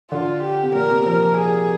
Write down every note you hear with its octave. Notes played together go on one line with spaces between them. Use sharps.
D3 F4
G4
C3
A#2 A#4
C3
F3 A#4
G#4